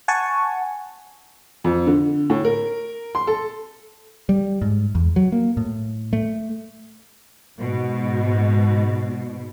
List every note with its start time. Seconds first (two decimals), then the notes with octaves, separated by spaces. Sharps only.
0.08 F#5 G#5 A5 C#6
1.64 F2
1.87 D3
2.30 A2
2.45 A#4
3.15 C6
3.27 A4
4.29 G3
4.62 G#2
4.95 E2
5.16 F#3
5.32 A#3
5.57 A2
6.13 A3
7.58 G#2 B2